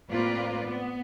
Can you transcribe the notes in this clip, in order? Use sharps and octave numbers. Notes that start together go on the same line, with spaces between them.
A2 A#3 C4 F4 B4 D5
B3